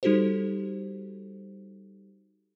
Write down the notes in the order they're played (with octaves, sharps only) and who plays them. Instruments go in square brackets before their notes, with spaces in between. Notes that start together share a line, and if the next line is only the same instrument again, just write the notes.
[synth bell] G3 D#4 F#4 G4 A4 C5